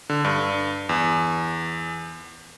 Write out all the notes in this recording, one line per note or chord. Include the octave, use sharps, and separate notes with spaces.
D3
G2
E2